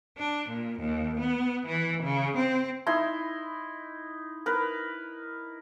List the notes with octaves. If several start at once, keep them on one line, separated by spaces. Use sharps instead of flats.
D4
A#2
D#2
B3
E3
C#3
C4
D#4 E4 C6
A#4 B4